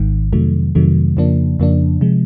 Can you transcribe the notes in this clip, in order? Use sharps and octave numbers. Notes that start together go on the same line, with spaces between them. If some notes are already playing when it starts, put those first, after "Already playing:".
Already playing: G#1 G#2 D#3
F2 C3 D#3 F#3 A3
F2 C3 D#3 F#3 A3
F2 C#3 F3 A#3 D4
F2 C#3 F3 A#3 D4
C3 F3 G#3